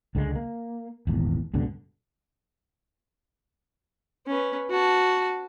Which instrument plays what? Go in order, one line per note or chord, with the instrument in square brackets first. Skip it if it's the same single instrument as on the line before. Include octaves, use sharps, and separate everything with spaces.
[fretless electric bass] C#2 D3 F3 G#3
A#3
D#1 G#1 E2
C#2 G2 B2 D3
[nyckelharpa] C#4 B4
F#4 A5